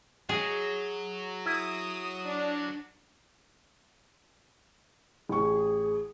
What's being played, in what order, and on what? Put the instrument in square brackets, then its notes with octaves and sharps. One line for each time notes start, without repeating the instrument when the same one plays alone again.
[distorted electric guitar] F#3 [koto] G#4
[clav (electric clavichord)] E4 [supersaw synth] D#6
[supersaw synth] D4
[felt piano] A1 C#6 [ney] G#4